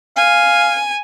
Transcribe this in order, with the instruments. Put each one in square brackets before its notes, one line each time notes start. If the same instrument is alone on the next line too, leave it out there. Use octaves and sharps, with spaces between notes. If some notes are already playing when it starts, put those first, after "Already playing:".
[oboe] F5 [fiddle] G#5